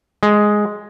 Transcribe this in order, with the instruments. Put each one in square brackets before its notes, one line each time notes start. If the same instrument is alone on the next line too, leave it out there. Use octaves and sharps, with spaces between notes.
[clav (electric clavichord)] G#3